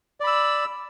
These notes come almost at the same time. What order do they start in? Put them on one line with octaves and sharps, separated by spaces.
D5 B5 E6